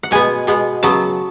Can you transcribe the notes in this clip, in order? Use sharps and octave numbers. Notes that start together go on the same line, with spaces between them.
F#5
B2 G#3 B3 G#5
B2 G#3 B3
C#3 F#3 B3 A5